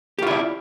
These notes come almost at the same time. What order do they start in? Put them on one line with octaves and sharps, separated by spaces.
G4 F4 E4 D5